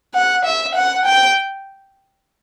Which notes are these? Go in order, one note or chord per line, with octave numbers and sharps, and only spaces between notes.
F#5
E5
F#5
G5